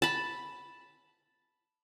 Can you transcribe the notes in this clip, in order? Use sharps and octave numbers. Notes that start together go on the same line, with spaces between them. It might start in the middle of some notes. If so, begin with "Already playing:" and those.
A5 B5